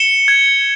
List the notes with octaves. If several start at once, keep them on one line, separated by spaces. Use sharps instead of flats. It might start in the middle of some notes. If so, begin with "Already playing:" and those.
Already playing: C#7 E7 G7
G#6